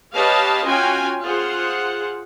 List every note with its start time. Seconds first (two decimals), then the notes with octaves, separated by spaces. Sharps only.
0.14 G4 B4 C#5 D#5 F5 A5
0.64 C#4 F4 F#4 G5 G#5
1.24 F4 G#4 C5 F#5